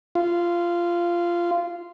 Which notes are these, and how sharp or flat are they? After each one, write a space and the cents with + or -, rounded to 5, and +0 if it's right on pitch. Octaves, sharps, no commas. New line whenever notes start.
F4 -15